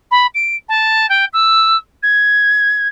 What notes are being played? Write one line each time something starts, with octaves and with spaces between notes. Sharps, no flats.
B5
D7
A5
G5
E6
G#6